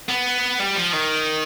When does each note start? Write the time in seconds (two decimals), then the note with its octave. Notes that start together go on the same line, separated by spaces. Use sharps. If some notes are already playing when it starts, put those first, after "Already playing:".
0.09 B3
0.60 G3
0.76 F3
0.93 D#3